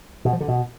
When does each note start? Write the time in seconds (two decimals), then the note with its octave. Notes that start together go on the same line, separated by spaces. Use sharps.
0.25 B2
0.33 F3
0.40 D3
0.48 B2